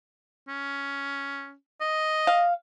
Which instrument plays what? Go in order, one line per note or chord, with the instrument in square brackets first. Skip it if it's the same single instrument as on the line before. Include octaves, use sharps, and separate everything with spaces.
[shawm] C#4
D#5
[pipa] F5